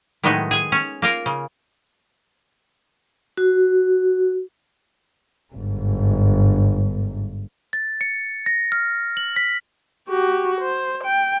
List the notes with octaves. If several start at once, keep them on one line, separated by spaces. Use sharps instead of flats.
A2 D#3 F#3 G#3 B3 D#4
G#4 G#5
C#4
A#3 F4 A#4
C#3
F#4
G1 G#2
A6
C#7
A#6
F6
F#7
B6
F#4 G4
C5
G5